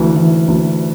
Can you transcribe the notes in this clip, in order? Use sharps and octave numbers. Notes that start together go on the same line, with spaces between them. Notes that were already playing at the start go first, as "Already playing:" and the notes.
Already playing: D2 E3
E3
D2